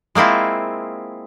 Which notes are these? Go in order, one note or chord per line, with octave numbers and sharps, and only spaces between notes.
G#3 A#3 C4 E4 F4